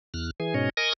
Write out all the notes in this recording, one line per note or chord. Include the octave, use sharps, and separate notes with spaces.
E2 F6 F#6
E3 G#4 G#5
G#2 B2 C#4 C#5 D#5
A#4 D#5 G#5 C#6 D#6 A#6